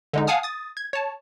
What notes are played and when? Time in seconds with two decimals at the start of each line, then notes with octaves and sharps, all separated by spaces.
0.13 D3 G#3 D#4
0.27 F5 F#5 G#5 A5 D#6 F6
0.43 D#6 A6
0.77 G#6
0.93 C#5 A5